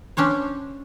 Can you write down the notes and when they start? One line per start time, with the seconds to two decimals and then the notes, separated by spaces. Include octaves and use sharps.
0.17 C#4 D4 C5 C#5